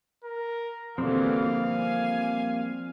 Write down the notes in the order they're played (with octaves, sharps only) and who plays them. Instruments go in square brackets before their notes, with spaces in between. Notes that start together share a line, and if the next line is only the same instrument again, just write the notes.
[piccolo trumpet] A#4
[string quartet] B2 D3 E3 [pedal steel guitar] F3 G3 A#3 [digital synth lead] C4 [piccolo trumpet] F5
[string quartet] G#5